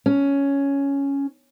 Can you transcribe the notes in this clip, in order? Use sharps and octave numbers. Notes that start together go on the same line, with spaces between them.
C#4